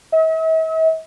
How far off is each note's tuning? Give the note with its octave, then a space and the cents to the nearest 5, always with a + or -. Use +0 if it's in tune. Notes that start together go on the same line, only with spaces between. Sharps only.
E5 -45